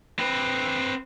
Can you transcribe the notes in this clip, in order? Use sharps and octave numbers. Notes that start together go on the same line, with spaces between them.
C4 B4